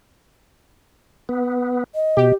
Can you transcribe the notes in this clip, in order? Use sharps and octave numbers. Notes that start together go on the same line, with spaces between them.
B3
D#5
B2 G4